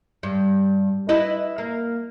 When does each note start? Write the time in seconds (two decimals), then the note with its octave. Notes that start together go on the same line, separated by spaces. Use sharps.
0.23 G2
1.09 E4 B4 D#5
1.58 A#3